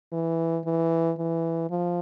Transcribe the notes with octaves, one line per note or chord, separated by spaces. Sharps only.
E3
E3
E3
F3